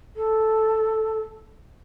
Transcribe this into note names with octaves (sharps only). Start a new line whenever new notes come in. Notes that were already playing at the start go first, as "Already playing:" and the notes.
A4